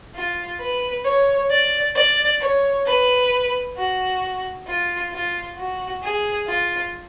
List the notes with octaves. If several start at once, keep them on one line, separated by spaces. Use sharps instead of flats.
F4
B4
C#5
D5
D5
C#5
B4
F#4
F4
F4
F#4
G#4
F4